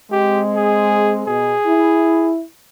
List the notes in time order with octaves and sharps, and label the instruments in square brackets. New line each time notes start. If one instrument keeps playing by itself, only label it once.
[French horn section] G#3 C4 [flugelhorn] G4
[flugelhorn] G#4
[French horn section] B2 [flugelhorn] G#4
[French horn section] E4